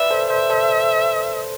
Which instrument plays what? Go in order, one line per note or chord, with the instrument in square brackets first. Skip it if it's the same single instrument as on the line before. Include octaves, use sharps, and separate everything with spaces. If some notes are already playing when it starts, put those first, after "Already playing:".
Already playing: [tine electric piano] B4 D5 [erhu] E5
[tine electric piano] A4 C5
[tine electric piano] A4 C5 [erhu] E5
[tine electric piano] A4 C5